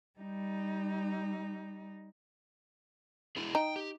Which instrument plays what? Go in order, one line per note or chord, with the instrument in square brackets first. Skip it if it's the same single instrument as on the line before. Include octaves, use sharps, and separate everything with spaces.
[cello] G3 D#4
[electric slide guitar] D4 E4 G#4
[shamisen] D#4 [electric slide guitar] G5
[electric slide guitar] G4